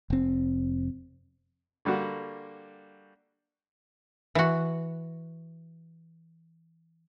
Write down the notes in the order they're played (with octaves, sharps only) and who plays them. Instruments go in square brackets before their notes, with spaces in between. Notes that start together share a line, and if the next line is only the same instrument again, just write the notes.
[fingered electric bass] F1 C4
[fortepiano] D3 G3 A#3 F#4
[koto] E3 F#4